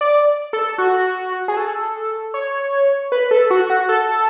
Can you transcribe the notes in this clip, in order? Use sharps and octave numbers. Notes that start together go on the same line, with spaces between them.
D5
A4
F#4
G#4
A4
C#5
B4
A4
F#4
F#4
A4